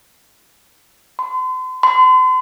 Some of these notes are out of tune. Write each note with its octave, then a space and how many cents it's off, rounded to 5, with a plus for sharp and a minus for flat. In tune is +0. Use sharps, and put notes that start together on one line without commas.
C6 -40
C6 -40